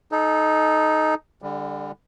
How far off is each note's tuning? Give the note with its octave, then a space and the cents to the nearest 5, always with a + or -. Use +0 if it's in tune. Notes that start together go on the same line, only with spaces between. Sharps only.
D#4 +0 A4 -30
D3 +0 G3 +30